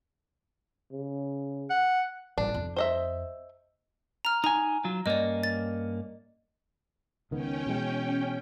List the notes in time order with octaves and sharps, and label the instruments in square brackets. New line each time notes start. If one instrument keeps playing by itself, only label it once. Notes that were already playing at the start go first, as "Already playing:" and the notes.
[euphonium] C#3
[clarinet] F#5
[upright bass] A1 G3 [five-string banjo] D4
[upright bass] F2
[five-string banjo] C5 D#5 E5
[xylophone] A#5 F6
[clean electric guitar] D#4 G#5 [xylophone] A#5
[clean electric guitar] F#3 F4
[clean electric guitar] G2 A#3 C#4 [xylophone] D5 D#5
[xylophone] A6
[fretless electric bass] C#2 D#3 B3 [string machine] C#4 G5
[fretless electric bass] B2 E3 G#3